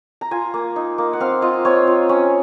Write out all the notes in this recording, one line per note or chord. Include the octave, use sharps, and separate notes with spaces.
A#5
F4 G#5
A#3
D#4
A#3
F#5
C4 F5
F4 D#5
C4 C#5
F4
C#4